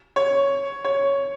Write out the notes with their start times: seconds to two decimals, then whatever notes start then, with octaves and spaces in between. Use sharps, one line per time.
0.16 C#5
0.85 C#5